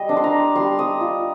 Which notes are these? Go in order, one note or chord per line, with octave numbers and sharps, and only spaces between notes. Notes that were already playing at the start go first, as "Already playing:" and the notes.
Already playing: G3 D#5
D4
C6
A#5
G3 C6
D#6
F4